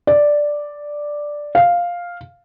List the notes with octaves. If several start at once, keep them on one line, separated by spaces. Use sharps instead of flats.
D5
F5